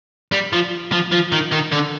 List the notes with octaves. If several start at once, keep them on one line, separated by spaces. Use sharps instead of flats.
G3
F3
F3
F3
D#3
D#3
D3